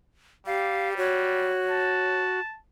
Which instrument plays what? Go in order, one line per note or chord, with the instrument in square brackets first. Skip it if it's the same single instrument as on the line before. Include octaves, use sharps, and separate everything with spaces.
[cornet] G3 [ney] G4 [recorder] F5
[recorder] F#4 [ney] C#5
[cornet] A5